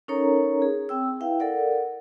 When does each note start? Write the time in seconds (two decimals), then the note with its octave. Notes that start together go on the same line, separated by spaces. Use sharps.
0.08 C#4 D#4 A4 A#4 C#5 A#5
0.62 G#4
0.89 C4 G5 E6
1.20 E4 B4 E5 F5 G5
1.40 A4 A#4 D5 F#5